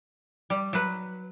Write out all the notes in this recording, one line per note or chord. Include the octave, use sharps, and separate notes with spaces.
G3
F#3 B4